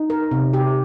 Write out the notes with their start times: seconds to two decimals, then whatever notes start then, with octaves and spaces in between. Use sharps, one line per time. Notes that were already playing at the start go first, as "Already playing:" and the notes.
Already playing: D#4
0.10 A#4
0.31 C3
0.53 G4